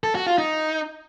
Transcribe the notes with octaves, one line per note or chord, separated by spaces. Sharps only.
A4
F#4
F4
D#4